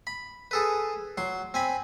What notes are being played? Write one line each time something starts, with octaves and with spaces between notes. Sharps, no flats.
B5
G#4 A4 B4
F#3 C6
C4 G#5 B5